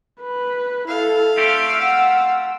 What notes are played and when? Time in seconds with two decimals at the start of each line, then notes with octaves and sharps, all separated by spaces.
0.22 B4 B5
0.88 E4 A4 F5
1.37 A3 C4 G4 E5 E6
1.82 F#5